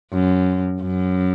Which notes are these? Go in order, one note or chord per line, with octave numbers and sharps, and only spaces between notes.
F#2
F#2